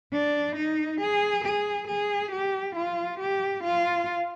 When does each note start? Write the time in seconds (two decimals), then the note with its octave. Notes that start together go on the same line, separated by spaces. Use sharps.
0.13 D4
0.56 D#4
1.01 G#4
1.45 G#4
1.88 G#4
2.32 G4
2.76 F4
3.20 G4
3.64 F4